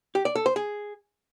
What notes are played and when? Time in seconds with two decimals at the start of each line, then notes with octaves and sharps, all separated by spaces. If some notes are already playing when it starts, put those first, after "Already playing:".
0.15 G4
0.25 D5
0.35 A4
0.46 C5
0.56 G#4